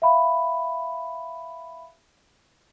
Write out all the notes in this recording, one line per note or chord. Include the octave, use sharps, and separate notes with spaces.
E5 F5 B5